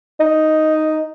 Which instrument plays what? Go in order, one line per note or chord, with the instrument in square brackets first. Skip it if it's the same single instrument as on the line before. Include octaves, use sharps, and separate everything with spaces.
[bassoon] D#4